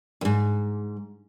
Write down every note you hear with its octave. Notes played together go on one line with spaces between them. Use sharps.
D#2 G#2